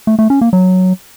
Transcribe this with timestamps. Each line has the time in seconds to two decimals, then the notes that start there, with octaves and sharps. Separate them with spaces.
0.07 A3
0.19 A3
0.30 C#4
0.41 A#3
0.53 F#3